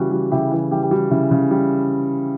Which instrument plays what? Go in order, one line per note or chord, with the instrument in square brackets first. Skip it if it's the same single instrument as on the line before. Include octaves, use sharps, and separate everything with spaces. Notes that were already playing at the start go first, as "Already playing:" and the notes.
Already playing: [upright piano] C#3 E3 G3 [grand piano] F#4
[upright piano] G3
[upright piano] C#3 [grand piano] E4 G4
[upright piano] E3
[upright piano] G3 [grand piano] E4 G4
[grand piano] G4
[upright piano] G3 [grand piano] F#4
[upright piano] C#3 [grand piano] E4
[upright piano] C#3
G3